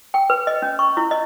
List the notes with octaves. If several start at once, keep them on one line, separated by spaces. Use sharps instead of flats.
G5
B4
D#5
C#4
C#6
E4
D#5